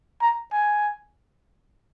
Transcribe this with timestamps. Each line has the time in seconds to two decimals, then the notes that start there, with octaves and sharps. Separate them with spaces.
0.22 A#5
0.52 G#5